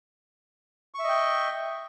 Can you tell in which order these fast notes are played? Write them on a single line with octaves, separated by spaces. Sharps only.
C#6 E5 D#5 G5